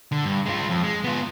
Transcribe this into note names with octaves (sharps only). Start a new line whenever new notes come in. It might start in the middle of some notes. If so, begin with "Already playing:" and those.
D3
G2
G#3 F4
F2
G#3
B3 F4